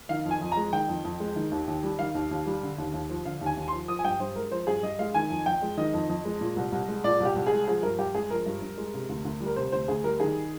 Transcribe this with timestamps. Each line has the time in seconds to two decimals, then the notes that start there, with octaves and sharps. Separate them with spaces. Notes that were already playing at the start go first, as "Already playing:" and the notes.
0.09 D#3 F5
0.25 F2
0.31 G#5
0.41 F2
0.52 G#3 A#5
0.73 D#3 G5
0.89 F2
1.05 F2
1.20 G#3
1.36 D#3
1.51 D#2
1.67 D#2
1.83 G3
1.99 D#3 F5
2.15 D#2
2.31 D#2
2.46 G3
2.62 D3
2.78 D#2
2.93 D#2
3.09 F3
3.25 D3 F5
3.41 D#2
3.46 G#5
3.57 D#2
3.68 F3 C6
3.88 F3 D#6
3.99 G#5
4.04 G2 G5
4.20 G2 C5
4.36 G#3 A#4
4.51 F3 C5
4.67 G2 G#4
4.83 G2 D#5
4.99 G#3 F5
5.14 D#3 G#5
5.30 F2
5.46 F2 G5
5.62 G#3
5.77 D#3 D#5
5.94 F2
6.09 F2
6.25 G#3
6.41 A#2
6.56 C2
6.72 C2
6.88 G#3
7.04 A#2 D5
7.20 C2
7.25 G4
7.36 C2
7.47 G#4
7.52 G#3
7.67 F3 G#4
7.83 G2 A#4
7.99 G2 G4
8.15 G#3 G#4
8.30 F3 A#4
8.46 G2
8.62 G2
8.77 G#3
8.94 C3
9.09 D2
9.25 D2
9.40 G3
9.46 A#4
9.56 C3 C5
9.72 D2 C5
9.88 D2 G#4
10.04 G3 A#4
10.20 D#3 G#4